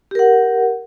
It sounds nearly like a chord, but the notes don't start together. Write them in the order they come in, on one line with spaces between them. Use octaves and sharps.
G4 A#4 F#5